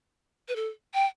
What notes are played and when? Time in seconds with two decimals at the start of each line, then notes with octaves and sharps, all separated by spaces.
0.48 B4
0.56 A4
0.94 G5